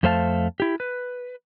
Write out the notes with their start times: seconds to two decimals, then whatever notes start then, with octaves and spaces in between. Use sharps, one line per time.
0.03 F2 A3 C5 F5 A5
0.60 E4 G4
0.80 B4